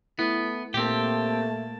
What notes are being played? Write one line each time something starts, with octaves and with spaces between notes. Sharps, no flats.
A3 B3 E4
A#2 A3 A#3 C4 G4 A5